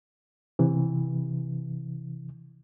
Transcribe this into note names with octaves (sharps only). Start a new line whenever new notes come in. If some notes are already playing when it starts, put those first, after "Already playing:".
C3 E3